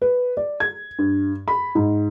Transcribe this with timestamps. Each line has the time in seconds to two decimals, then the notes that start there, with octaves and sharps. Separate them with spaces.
0.02 B4
0.37 D5
0.60 G#6
0.99 G2
1.48 B5
1.75 G#2